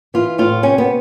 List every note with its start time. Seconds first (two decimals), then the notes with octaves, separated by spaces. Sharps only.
0.14 E3 F4
0.38 A2 F4
0.63 C3 C#4
0.78 B3